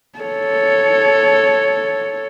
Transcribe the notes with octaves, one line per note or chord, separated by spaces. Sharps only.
A4 C#5